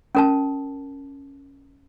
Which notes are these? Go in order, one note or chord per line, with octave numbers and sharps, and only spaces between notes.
C#4 A#4 A5